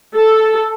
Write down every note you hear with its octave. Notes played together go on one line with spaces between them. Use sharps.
A4